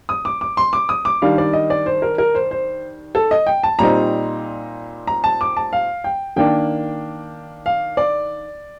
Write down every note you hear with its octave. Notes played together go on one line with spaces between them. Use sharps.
D#6
D6
D6
C6
D6
D#6
D6
D#3 G3 D4 F5
D5
D#5
D5
C5
A#4
A#4
C5
C5
A4
D#5
G5
A5
A#2 G3 C4 D#4 A#5
A#5
A5
D6
A5
F5
G5
D#3 A#3 D4 G5
F5
D5